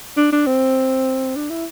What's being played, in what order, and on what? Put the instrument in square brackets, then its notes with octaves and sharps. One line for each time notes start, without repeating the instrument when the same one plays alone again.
[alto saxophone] D4
D4
C4
D4
E4